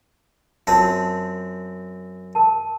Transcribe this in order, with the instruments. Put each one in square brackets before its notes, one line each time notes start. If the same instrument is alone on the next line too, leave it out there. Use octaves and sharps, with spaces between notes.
[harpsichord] F#2 C4 [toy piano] F4 A#4 A5
[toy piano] A#4 A5